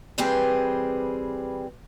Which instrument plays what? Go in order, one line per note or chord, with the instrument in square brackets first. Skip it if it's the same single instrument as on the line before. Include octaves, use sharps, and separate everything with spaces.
[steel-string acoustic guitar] E3 G3 C4 G4 G#4 B4